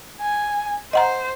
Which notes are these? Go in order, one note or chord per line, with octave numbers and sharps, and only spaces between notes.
G#5
C5 D#5 F#5 A#5